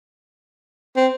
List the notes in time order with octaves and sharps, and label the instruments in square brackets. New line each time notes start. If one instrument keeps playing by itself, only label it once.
[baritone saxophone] C4